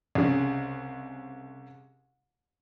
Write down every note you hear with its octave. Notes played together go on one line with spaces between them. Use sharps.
C2 C#3